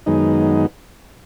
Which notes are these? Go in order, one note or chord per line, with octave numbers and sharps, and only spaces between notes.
F#2 D#3 G#3 B3 D#4